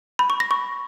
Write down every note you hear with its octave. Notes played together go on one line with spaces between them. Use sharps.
B5
C#6
A#6
C#6